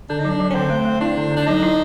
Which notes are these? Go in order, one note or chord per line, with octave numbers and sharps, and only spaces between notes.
D3 D4
D#4
F#3 D4
F#3
C#4
D3 C4
A3
A3
D4 E4
D3
D3
D4
F#3 D#4
E4